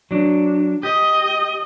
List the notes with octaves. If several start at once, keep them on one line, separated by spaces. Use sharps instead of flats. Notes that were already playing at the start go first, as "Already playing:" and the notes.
F#3 D4
G4 D#5